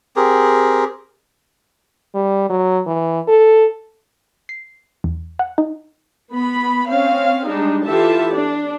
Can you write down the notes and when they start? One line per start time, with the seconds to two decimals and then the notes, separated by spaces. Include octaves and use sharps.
0.16 C4 G4 G#4 A#4
2.15 G3
2.50 F#3
2.87 E3
3.28 A4
4.49 C7
5.04 E2
5.39 F#5
5.58 D#4
6.29 B3 B5
6.89 C4 C#4 F5
7.47 G3 G#3 D4 D#4
7.86 E3 F4 G4 A4 E5 A5
8.31 D4 D5